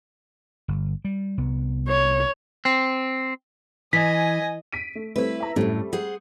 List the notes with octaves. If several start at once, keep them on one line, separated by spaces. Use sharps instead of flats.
G1
G3
C2 B3
C#5
C4
E3 D#5 G#5 B6
B6 D7 D#7
A3
G3 A3 C4 E4 B4
E5 A#5
F#2 A2 G3 A3 C4
G#4 C5 F#5